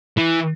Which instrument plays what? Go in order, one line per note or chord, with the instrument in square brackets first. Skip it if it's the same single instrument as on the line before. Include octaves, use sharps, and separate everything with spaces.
[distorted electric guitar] E3